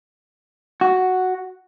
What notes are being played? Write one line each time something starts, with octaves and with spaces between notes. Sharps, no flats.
F#4